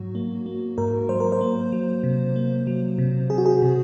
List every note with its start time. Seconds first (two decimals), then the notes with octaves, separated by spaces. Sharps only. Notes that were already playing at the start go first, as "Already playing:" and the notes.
Already playing: G#2 F#3 F#4
0.15 A#3
0.46 A#3
0.78 G#2 A#4
1.09 F#3 C5
1.20 A#4
1.32 C5
1.41 A#3
1.72 F#3
2.03 C3
2.36 A#3
2.67 F#3
2.98 C3
3.30 C3 G#4
3.38 F#4
3.46 G#4
3.62 C3